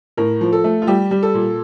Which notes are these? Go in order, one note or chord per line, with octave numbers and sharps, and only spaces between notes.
A2 A#4
F3
A4
A3
F4
G3 G4
G3
A4
A#2